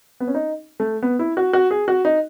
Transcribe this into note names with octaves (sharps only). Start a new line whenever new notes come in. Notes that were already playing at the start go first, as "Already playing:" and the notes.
B3
C#4
D#4
A3
B3
E4
F#4
F#4
G#4
F#4
D#4